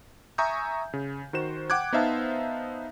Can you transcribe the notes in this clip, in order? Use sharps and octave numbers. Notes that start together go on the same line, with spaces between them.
E5 G#5 A#5 C#6 D#6 G6
C#3
D#3 F#4 C5 E7
F#5 G5 D6 F#6 G#6
B3 D#4 C5 E5 F5 A5